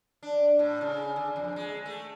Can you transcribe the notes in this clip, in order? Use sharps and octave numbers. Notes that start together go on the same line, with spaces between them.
D4
A2
C#3
D3
F2
G#3
A3